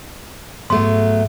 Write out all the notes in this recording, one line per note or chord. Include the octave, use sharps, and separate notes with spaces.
G#2 F#3 A3 B3